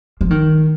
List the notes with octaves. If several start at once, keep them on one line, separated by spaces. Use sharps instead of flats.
F3
D#3